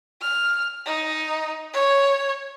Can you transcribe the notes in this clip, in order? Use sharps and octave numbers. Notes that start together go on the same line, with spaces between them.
F6
D#4
C#5